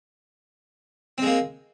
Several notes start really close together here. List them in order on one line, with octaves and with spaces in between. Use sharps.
C4 G#3 A#3